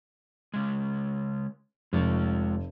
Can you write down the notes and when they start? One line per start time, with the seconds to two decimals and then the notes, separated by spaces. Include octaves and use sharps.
0.54 C#3 G#3
1.93 F1 G#3 F4